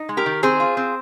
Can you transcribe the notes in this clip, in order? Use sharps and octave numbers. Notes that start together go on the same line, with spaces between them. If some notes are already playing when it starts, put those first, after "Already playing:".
Already playing: D#4
G#3
G4 A#4
D#3
C4 G#4 C5
F4
C4